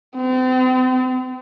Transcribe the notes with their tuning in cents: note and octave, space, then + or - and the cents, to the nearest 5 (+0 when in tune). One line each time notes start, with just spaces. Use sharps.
C4 -40